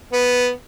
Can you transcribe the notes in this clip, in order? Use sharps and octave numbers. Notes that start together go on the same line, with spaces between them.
B3